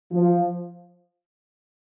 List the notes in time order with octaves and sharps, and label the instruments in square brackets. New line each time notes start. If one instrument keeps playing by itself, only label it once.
[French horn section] F3